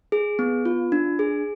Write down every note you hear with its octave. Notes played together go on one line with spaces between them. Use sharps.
G#4
B3
F4
D4
G#4